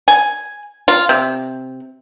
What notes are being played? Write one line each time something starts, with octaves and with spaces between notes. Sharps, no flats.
G#5
F4
C3